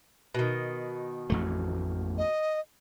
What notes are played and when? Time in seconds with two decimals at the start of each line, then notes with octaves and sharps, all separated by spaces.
0.34 B2 D#3
1.30 A1 F2 A3
2.18 D#5